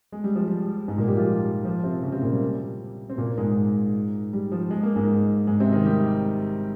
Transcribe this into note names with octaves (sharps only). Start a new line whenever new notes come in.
G#3
G3
F3
G3
G#2 G#3
A#2 A#3
G3 G4
F3 F4
F3 F4
C3 C4
C#3 C#4
C3 C4
A#2 A#3
G3
C4
A#2 A#3
G#2 G#3
G3
F3
G#3
A#3
G#2 G#3
G#2 G#3
C3 C4
D#3 D#4
G3 G4